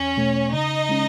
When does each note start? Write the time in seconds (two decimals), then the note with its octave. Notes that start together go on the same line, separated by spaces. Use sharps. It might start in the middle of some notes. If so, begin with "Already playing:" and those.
Already playing: E2 C#4 C#5
0.17 B2 A3
0.53 C#3 D#4 D#5
0.89 G#3 C#4